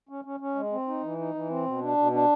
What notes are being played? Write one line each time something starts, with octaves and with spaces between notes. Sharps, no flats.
C#4
C#4
C#4
G#3
C4
D#4
E3
D#4
E3
C4
B2
D4
B2
D4